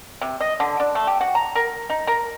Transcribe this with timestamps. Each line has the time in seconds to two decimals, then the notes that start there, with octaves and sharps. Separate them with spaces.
0.21 C3
0.40 D#5
0.60 D3
0.80 D4
0.95 A3
1.07 G4
1.21 F#4
1.35 A#5
1.55 A#4
1.90 D#4
2.07 A#4